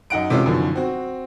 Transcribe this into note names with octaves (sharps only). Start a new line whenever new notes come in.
F#2 D#4 F#5 D7
C3 E3 G#3 C#4 F4
F#2 B2 D3 D#3 F3
C4 F#4